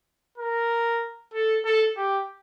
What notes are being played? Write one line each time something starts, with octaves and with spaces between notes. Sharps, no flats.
A#4
A4
A4
G4